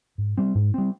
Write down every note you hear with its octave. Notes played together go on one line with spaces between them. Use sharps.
G#2
G3 C4
G#2
G3 C4